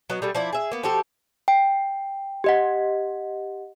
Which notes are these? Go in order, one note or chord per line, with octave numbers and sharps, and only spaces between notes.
F#3 B3 D#5
G3 A3 G#4
F3 E4 D5
G#4 E5
A#3 B3
F3 F#4 G4 A4
G5
G4 D#5 F#5